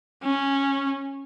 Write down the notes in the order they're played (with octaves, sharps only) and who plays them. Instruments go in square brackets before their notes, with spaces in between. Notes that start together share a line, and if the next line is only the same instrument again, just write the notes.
[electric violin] C#4